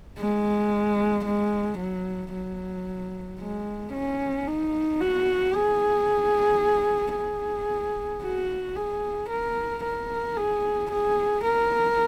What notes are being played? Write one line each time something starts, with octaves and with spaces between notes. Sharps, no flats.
G#3
G#3
F#3
F#3
G#3
C#4
D#4
F#4
G#4
G#4
F#4
G#4
A#4
A#4
G#4
G#4
A#4